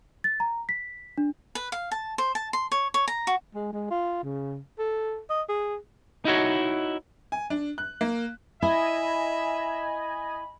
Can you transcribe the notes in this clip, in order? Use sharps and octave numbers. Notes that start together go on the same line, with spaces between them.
A6
A#5
B6
D4
B4
F5
A5
C5
A5
C6
C#5
C#5
A#5
F#4
G#3
G#3
F4
C#3
A4
D#5
G#4
D#4 E4 F#4 C#5
G#5
D4
F#6
A#3
E4 D#5 E5 G#5 B5